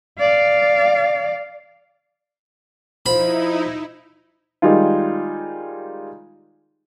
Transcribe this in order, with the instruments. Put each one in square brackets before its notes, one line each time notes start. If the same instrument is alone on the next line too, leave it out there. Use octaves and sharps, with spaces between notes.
[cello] D5 F5
[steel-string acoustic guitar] F3 [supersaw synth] D#4 E4 [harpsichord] B5
[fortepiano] D#3 G3 G#3 D#4 F4